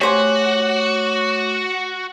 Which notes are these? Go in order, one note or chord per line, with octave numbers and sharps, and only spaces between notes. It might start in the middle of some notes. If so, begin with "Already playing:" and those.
A3 F#4 G4 C5 C#5 G#5 D6